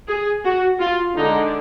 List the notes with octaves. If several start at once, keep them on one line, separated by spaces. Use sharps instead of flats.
G#4
F#4
F4
D3 G#3 D4 D#4